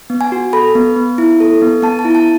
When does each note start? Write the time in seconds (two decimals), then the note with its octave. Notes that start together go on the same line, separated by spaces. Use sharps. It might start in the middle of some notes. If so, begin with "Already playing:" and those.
0.10 B3
0.21 G#5
0.32 F#4
0.53 A4 B5
0.75 B3
0.96 B3
1.18 E4
1.40 A4
1.62 B3
1.82 B3 A5
1.99 A5
2.05 E4
2.15 A5